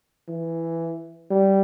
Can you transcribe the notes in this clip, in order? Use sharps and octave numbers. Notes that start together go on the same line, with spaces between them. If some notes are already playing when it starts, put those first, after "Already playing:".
E3
G3